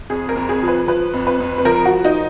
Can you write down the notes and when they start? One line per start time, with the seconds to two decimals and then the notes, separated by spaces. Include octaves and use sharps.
0.10 F2 G#4
0.29 A#4
0.36 F2
0.49 G#4
0.62 F3
0.68 B4
0.88 F3 B4
1.13 F2
1.27 B4
1.40 F2
1.58 B4
1.65 F3 A#4
1.85 F#4
1.91 F3
2.05 D#4